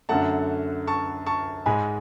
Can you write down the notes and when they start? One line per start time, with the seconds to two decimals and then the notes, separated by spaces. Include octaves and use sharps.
0.09 F#2 D3 F#3 A3 F#5 A5
0.87 A5 C#6
1.26 A5 C#6
1.66 G#2 G#3 G#5 B5